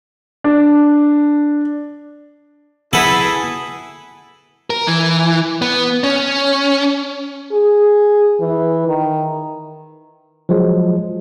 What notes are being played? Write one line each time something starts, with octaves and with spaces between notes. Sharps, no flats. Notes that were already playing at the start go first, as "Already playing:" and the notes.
D4
E4 G#4 A4 B4 F#5
A#4
E3
B3
C#4
G#4
E3
D#3
F3 F#3 G#3